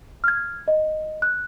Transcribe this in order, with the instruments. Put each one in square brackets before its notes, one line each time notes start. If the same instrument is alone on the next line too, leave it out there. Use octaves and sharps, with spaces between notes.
[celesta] F6 G#6
D#5
F#6